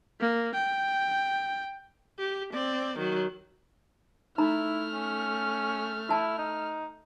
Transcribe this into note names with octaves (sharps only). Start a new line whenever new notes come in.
A#3
G5
G4
C4 D5
D#3 F#3
A3 D#4 E4 A#5 B5 F6
C#4
E4 F#4 A5
D#4